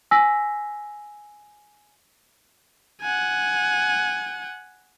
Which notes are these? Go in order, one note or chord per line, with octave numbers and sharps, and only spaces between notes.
G#5 E6 A#6 B6
F#5 G#5